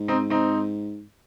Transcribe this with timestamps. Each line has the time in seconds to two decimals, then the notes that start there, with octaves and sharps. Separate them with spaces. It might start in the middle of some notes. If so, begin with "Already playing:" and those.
Already playing: G#2
0.08 C4 D#4
0.30 C4 D#4